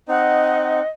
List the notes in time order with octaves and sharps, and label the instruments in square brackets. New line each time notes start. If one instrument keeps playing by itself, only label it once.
[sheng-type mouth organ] C4 D#4 [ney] D#5 [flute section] F#5